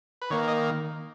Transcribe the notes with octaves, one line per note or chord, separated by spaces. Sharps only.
B4
D#3 A#3 C#5
D#5